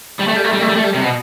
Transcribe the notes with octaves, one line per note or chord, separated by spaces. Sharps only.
G3
A3
G3
A3
G3
A3
G3
A3
G3
C3
B2